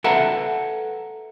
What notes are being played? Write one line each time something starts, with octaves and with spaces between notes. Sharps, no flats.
A4 B4 E5 F#5 A5 A#5